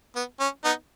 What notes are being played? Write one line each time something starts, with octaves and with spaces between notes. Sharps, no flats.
B3
C#4
B3 D#4